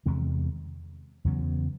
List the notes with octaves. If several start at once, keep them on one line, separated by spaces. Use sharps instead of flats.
E2 C3 D#3 G#3
E2 C#3 F#3 B3